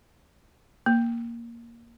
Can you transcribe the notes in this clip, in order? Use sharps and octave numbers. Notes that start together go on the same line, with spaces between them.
A#3